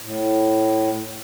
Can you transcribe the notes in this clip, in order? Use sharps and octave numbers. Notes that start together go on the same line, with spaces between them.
A2